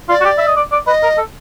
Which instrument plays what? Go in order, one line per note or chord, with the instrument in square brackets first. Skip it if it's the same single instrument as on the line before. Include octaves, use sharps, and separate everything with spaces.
[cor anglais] F4 [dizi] D5
[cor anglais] F#4
G4
E5
D#5
D5
D5
[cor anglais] B4 [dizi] D#5
[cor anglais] A#4
A4